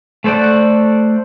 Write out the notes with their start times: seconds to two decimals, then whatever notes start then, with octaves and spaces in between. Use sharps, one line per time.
0.24 A3 A4 C5 D5 F#5